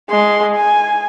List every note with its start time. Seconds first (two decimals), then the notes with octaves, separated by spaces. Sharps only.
0.10 G#3 C6
0.56 G#5